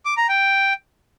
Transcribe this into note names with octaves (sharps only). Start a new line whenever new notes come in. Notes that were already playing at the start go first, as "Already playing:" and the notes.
D6
A#5
G5